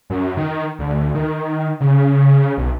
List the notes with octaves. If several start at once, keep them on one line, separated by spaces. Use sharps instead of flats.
F#2
D#3
D2
D#3
C#3
B1